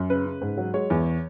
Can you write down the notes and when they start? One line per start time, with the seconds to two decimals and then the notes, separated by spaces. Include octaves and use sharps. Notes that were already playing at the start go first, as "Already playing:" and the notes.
Already playing: F#2
0.10 C#3 B4
0.26 C#3
0.41 G#2
0.57 F#3
0.74 G#3 C#5
0.90 E2